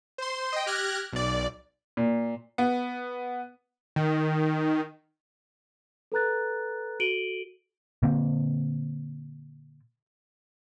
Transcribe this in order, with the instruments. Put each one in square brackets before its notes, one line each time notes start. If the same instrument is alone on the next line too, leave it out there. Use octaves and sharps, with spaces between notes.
[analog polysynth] C5 C6
D#5 G5
G4 F6 F#6 G#6 A#6
B1 D5
[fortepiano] A#2
[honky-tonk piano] B3
[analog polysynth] D#3
[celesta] A4 B4 A#5 F#6 A6
F#4 A4 D7 D#7 F#7 G7
[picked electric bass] A#2 D3 A#3 C4